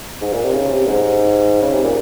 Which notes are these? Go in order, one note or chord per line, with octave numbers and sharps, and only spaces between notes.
G#2
A#2
C3
C#3
C3
G#2
C#3
C3
A#2